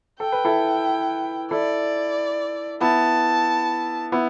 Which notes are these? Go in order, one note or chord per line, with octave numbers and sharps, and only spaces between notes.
A4 G5
B4
E4 A4
E4 A4 D5
B3 E4 A5
B3 E4